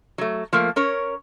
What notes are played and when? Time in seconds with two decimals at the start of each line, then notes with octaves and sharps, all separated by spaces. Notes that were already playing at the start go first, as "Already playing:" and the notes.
0.18 F#3 A3
0.53 F3 A3 A#3
0.76 C#4 A#4 C#5